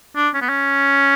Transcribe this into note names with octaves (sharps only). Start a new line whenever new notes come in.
D4
C#4
B3
C#4